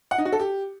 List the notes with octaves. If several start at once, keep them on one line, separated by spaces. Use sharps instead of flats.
F#5
D#4
F#4
A4
G4